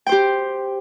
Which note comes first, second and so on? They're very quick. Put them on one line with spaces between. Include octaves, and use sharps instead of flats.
G5 C5 G4